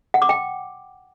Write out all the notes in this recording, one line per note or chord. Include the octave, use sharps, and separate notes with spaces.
F#5
D6
G5